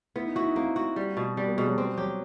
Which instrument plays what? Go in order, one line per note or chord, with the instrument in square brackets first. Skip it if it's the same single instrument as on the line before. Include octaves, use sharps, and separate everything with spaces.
[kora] B3 [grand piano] E4
[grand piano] D#4
[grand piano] E4 [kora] F#4
[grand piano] D#4
[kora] A#3 [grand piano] C4
[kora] F#4
G3
B2
[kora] G3 [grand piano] B3
[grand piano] A#3
[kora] B2 [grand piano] G#3
[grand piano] F#3
[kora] C4
[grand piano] F#3 [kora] G4